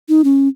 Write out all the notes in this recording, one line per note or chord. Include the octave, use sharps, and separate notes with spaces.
D#4
C#4